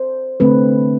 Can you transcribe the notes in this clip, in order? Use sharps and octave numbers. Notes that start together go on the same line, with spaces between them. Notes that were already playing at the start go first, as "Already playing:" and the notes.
Already playing: C5
D3 A3 C4 B4